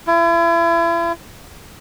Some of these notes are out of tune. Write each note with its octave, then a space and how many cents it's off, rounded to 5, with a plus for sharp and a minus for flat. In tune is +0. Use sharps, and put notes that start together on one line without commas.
E4 +40